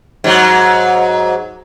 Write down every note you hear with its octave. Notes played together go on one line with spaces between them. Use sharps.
G#2 F#3